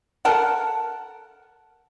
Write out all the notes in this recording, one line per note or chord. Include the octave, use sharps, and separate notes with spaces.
A4 A#4 F#5